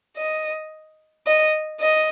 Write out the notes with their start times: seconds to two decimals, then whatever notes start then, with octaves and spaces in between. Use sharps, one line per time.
0.17 D#5
1.27 D#5
1.81 D#5